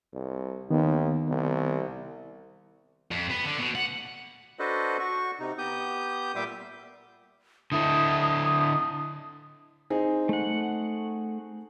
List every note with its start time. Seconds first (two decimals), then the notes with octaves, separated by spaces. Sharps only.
0.14 C2
0.70 D#2 D#3 B3
1.28 C2
3.11 F2
3.30 B3
3.44 D3
3.59 B2
3.75 F#5
4.59 D4 F#4 A4 B4 C5 D#5
5.00 F#4 C#6
5.40 C3 D#4
5.58 B3 G4 D#6 G6
6.36 A#2 G3 E5 C6 D6 G6
7.72 D3 E4 A4 D#6
9.90 C4 D#4 G#4
10.29 A3 F#5